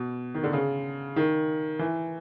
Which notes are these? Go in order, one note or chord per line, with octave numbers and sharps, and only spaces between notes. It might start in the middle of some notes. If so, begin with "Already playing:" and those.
Already playing: B2
D#3
D3
C#3
D#3
E3